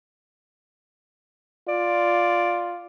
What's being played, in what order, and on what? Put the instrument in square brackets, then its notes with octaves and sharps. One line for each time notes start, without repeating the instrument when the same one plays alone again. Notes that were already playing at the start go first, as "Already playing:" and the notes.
[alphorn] F4 [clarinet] D5